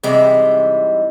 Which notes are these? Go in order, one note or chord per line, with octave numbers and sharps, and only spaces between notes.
G#2 C3 E3 G3 G#3